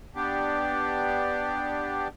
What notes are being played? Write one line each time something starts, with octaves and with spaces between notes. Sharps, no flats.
B3 D4 G4